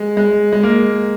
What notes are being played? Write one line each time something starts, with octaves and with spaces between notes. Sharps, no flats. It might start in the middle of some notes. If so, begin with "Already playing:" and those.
Already playing: G#3
G#3
G#3
A#3